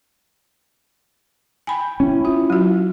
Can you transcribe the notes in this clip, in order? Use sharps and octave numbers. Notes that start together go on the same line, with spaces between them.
G5 G#5 B5
C#4 E4
F4
F#3 F#4